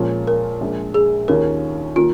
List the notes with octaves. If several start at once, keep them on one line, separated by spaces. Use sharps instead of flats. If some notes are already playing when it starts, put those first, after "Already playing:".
Already playing: A#2 F3 G#3 C#4 F4
A#4
A#1 A#2 G#3
G#4
D#2 D#3 C#4 F4 A#4
D#3 A#3 F4